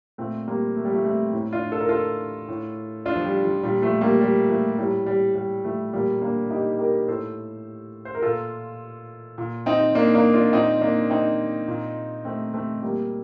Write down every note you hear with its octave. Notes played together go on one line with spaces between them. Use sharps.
A#2 A3 C4
G3 A#3
A3
G3
F3 A3
A3 C4
A2
D4 F4
A4
A#4
F4 A4
A2
D4 F4
F3
G3
F3
A#2 G3
F3 A3
G3 A#3
G3
F3 A3
A2 G3
G3
G3
F3 A3
A#2 G3 A#3
A#3 D4
D#4 G4
G4 A#4
A2 A4 C5
C5
A#4
A#2 F4 A4
A#2
C4 D#4
A#3 D4
A#3 D4
D4 F4
A#2 C4 D#4
A#3 D4
C4 D#4
A#2
A3 C4
A3 C4
A#2 G3 A#3